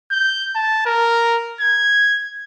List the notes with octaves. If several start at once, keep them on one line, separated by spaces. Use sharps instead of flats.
G6
A5
A#4
G#6